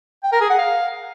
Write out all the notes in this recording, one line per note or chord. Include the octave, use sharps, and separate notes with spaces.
G5
A#4
G#4
F#5
F5